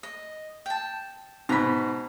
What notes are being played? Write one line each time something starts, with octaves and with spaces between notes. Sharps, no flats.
D#5
G5 A5
G#2 B2 A#5 B5